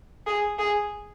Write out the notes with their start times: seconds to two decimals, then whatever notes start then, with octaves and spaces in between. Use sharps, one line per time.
0.26 G#4
0.59 G#4